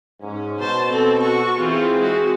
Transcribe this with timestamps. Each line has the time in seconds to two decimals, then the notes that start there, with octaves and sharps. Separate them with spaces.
0.22 G#2 C#4
0.59 B2 C5 A5
0.91 C4 A4
1.21 F#4 C#6
1.57 E3 C4 E4 F4 G#4
1.97 G#3 F#4